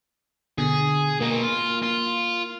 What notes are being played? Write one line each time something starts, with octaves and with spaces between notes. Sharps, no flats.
B2 D3 G#4
B2 A#3 D#4
F4
F4